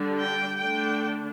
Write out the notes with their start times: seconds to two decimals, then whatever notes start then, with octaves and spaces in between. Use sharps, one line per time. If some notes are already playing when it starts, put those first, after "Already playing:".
Already playing: D3 G3 D4
0.18 G5
0.60 D3 A3 D4 G5